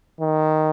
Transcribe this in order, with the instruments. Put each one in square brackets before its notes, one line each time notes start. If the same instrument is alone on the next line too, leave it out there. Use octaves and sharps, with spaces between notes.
[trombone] D#3